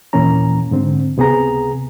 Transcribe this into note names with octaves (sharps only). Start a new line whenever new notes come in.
D#2 A#2 E3 A#3 C#4 A#5
G#2 D3 C4
C#2 C3 B3 G#4 A#5